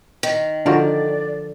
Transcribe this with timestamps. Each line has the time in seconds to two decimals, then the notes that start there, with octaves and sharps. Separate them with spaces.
0.23 D#3
0.66 D3 F3 D4 F4 F#4 A#4 D5